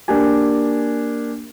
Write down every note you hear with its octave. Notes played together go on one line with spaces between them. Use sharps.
A#3 D4 G4 G#5